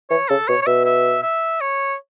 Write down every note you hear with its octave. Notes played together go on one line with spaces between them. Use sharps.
E3 C#5
C#3 A4
B2 C#5
C#5
B2 E5
E5
E5
C#5